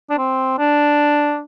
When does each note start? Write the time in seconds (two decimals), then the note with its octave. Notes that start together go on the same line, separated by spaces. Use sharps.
0.10 D4
0.18 C4
0.58 D4